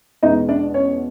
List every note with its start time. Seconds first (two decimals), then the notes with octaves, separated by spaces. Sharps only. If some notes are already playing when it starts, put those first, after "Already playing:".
0.23 E2 B2 G#3 B3 D#4 D#5
0.49 D4 D5
0.74 C#4 C#5